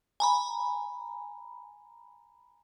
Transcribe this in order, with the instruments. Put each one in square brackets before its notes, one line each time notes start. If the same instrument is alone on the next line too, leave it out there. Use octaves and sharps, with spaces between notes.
[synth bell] G#5 A#5 B5